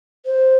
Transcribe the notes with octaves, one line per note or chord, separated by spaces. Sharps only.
C5